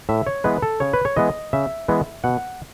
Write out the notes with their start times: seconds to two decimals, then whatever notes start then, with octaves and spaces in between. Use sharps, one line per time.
0.09 A2 E5
0.27 C#5
0.44 E3 G#3 B3 B4
0.62 A4
0.80 C#3 C#5
0.93 B4
1.05 C#5
1.16 E3 G#3 B3 D#5
1.53 C#3 E5
1.88 E3 G#3 B3
2.24 B2 F#5